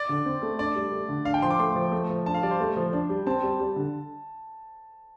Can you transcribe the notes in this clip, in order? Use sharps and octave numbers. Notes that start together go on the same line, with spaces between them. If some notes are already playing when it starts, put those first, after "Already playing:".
Already playing: D5
D3
C4
A3
D4 D5
G3
A3
D3
D4 F5
G5
F3 C6
D6
A3 C6
F3
A3
F3
D4 A5
F5
G3 D5
C5
A3
F3
D4
G3
C4 A5
G3
G3
D3